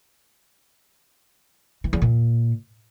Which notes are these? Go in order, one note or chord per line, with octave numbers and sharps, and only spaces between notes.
E3
E2
A#2